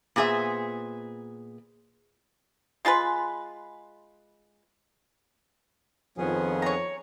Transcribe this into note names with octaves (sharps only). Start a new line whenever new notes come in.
A#2 B3 G#4 C5 E5
G#3 F4 G#4 B4
F2 D#3 F3 B3 C#4 D#4 G#4
C#5 A#5